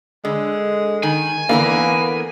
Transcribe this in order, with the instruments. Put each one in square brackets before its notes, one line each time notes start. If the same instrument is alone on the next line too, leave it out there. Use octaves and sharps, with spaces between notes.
[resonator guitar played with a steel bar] D3 [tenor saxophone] G#3
[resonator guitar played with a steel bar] D#3 [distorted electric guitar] G#5
[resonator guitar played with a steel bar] D3 E3 A#4 [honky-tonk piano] A#3 [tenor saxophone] B3